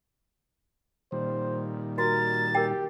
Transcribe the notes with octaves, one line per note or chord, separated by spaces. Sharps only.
A#2 D#3 G3 C5
F#4 A#4 A6
G4 A#4 G5